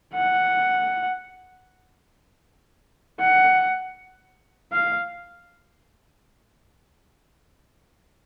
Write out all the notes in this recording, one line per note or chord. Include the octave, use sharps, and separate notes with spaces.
F#5
F#5
F5